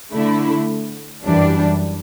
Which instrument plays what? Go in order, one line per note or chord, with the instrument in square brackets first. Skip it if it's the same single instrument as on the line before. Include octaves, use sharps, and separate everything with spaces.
[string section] D3 A3 E4
F#2 E3 G3 D4